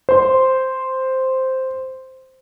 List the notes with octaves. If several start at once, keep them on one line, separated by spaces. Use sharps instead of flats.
C5 C6